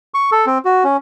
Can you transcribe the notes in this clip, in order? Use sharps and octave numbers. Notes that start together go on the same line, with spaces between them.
C#6
A4
C4
F#4
C#4